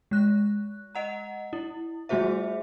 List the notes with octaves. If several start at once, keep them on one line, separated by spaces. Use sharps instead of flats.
G#3 F#6
D#5 F#5 A#5
E4
G3 A3 F#4 G#4 C5 E5